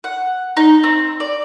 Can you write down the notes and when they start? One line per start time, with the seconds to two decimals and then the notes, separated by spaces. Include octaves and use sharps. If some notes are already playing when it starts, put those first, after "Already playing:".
0.04 F#5
0.57 D#4
0.83 C4
1.20 D5